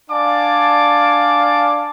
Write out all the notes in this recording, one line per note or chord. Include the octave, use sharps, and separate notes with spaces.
D4 D5 F5 G#5 A5 D6